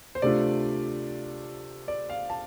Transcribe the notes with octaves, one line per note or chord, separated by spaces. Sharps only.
C5
C3 A3 D4 F4 D5
D5
F5
A5